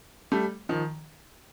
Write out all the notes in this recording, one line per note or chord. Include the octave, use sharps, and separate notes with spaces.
G3 A3
D#3 F3